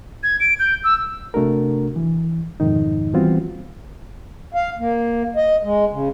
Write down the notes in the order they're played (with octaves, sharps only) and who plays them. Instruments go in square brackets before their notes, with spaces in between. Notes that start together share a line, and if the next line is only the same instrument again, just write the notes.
[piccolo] G#6
D7
G6
E6
[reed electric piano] C3 A3 D4 F#4 A#4
E3
F2 G#2 B2 D#3 D#4
E3 G3 B3 C4 F4 F#4
[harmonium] F5
A#3
D#5
G#3
C#3